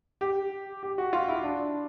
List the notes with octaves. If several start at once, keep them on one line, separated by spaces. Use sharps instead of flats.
G4
G4
F#4
F4
E4
D4